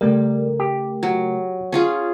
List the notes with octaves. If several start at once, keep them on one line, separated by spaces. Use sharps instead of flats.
C#3 G3 A3 A#4
G4
F#3
C#4 F4 G#4